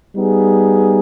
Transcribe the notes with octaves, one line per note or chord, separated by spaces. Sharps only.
G3 B3 D#4 G#4